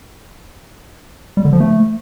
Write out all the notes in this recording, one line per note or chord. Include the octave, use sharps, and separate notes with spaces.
G3
D3
F3
A3